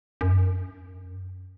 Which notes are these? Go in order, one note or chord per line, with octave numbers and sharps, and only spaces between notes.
F#2